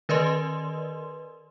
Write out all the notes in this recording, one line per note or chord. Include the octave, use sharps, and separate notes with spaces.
D#3 A#4 B4 D5 D#5 C6